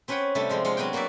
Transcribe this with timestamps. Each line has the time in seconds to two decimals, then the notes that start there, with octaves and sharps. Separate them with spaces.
0.08 C4 C#4 B4 C#5 F#5 G5
0.35 C3 G3 A3 D4 A4
0.49 F3 G#3 C4
0.65 G#3 F4 F#5
0.77 F#3 B3 C4 F#4 G5
0.93 A#3 F#4 C5 D5 E5